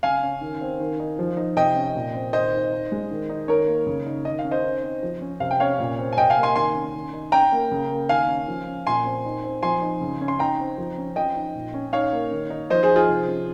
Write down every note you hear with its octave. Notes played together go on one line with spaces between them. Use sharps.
C#3 F5 G#5
C#4
D#3
C4
D#3
D#4
F3
D#4
C3 D#5 G5
C#4
A#2
C4
D#3 C5 D#5
D#4
D#4
G#3
D#3
D#4
D#3 A#4 C#5
A#3
C#3
D#4
D#3 D#5
F5
C#4
C5 D#5
D#4
C4
F3
C#4
C3 F5
G5
C#4 C#5 F5
A#2
C4
G#5
C3 D#5 G5
F5 G#5
A#3
G#5 C6
D#3 G#5 C6
C#4
D#3
D#4
C#4 G5 A#5
A#3
C#3
A#3
D#3 F5 G#5
C#4
F3
C#4
A#2 G#5 C6
C4
D#4
C4
F3 G#5 C6
D#4
C#3
C#4
C6
D#4 G5 A#5
C4
F3
C#4
F3 D#5 G5
D#4
A#2
C#4
D#4 C#5 F5
A#3
D#3
D#4
F3 C5 D#5
G#4 C5
D#4
F4 G#4
C3
C#4